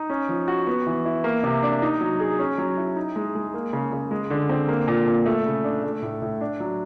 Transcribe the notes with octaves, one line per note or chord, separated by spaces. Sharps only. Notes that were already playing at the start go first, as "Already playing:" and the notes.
Already playing: D#4
C#4
F3
F#4
B3
E3
E4
A#3
C3
D4
D#4
F#3
G#4
C#4
F#3
E4
D#4
G#3
G#3
A#3
C#3
C#3
G#3
D3
C4
A#3
A#2
A#2
A3
C#3
D4
A3
A2
A2
D4
F#3